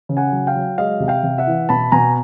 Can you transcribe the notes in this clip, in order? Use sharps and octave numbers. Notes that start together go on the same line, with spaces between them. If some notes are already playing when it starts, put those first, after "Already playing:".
C#3
F#5 G#5
F#3
F5 G5
F#3
G#3 D#5 F5
C3
F5 G5
C3
E5 F#5
E3
B2 A5 B5
B2 G#5 A#5